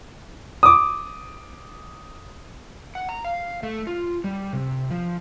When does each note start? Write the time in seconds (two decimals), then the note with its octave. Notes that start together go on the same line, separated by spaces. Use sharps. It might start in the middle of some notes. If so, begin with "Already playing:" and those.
0.63 D6 D#6
2.95 F#5
3.09 A#5
3.25 F5
3.63 A3
3.87 F4
4.24 G3
4.53 C3
4.90 F3